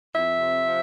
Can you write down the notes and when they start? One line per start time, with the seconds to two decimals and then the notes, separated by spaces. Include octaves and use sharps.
0.14 F2 E5
0.40 C3
0.65 F3